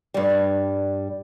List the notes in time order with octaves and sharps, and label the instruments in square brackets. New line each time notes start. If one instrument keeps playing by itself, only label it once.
[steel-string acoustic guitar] G2 G3